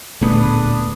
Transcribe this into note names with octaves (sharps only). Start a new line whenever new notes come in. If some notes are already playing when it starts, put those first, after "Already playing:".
D1 E2 A#2 A3 B3 D4 B4 D#6